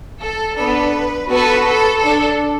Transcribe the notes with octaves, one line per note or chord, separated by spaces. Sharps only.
A4
B3 D4 A4 B4
B3 F#4 A4 B4
A4
D4 A4